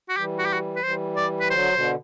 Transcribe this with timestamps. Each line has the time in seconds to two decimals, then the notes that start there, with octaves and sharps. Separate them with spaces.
0.09 F#4
0.17 E3 G3 G4
0.39 F#4
0.46 G4
0.53 F#4
0.76 B4
0.83 E3 G3 C5
1.16 D5
1.40 B4
1.50 D3 F#3 C5
1.72 B2 D3